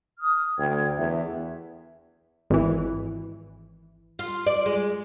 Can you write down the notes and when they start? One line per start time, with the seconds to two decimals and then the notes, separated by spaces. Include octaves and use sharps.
0.20 D#6 F6
0.58 D2 G5 G#6
0.98 E2 E5
2.50 G#1 E3
4.19 F4
4.47 D5
4.66 G#3